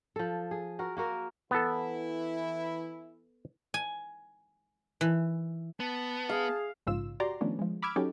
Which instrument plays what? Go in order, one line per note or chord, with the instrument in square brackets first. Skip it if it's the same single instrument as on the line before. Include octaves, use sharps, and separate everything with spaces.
[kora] F3 A4
G#4
F#4 A#4
A#3 F#4 A#4
[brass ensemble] E3 E4 [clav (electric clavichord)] B3 A4
[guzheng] G#5
E3
[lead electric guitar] B3 [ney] A5
[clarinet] G#4 [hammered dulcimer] F5
[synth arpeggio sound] A#1 G#2 C#3 F4 E6
F#4 G4 D5 A#5 C6
D#3 F3 A3 B3 C#4 D4
F3 G#3
B5 D6 E6 F6 G#6 D7
F#3 C#4 D#4 F#4 G4 A4